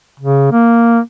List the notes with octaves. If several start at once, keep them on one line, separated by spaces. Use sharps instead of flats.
C#3
A#3